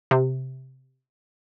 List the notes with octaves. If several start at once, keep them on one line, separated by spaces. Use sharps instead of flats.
C3